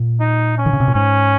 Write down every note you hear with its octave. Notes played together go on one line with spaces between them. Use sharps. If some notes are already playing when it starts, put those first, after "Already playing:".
Already playing: A#2
D#4
C#4
D#3
C#3
C3
A#2
G#2 C#4